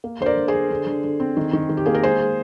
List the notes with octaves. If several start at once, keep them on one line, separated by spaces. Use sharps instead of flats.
A#3
D3 C5
A#4 D5
D3
G#4 C5
D3
D3
D3
D3
C4
D#3
D#3
D#3
G4
A#3 G#4
A#4
G#3 G#4 C5
G#3